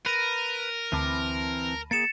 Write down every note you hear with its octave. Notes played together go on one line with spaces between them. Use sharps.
A#4 B4 A#6 D#7
D2 E3 C4 A5 B5 D6
A#3 G#4 A6 C#7 E7